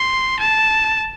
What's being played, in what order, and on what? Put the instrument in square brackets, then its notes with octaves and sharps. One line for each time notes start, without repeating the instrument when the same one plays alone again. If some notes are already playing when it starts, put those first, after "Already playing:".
Already playing: [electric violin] C6
A5